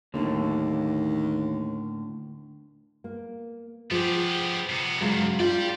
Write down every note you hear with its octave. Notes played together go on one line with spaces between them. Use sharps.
D#2 A2 D3
A#3
F3 B3 G4 G#4
C3 B3
G2 A#2 C#3 F#3 G#3
F4 D5 G5